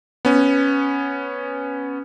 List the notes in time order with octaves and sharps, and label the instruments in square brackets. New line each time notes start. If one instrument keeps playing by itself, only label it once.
[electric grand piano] B3 C#4